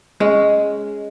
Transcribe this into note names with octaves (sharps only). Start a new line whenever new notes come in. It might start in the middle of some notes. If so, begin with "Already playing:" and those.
G#3 C#4